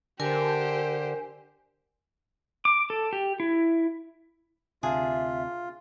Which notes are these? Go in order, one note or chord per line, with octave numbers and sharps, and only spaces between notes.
D3 G4 A#4 C5 G#5
D6
A4
G4
E4
D2 C3 D4 F4 G#4 E5